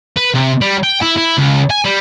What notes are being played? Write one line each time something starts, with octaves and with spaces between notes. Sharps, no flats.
B4
C3
G3
G5
E4
E4
C#2
G#5
G3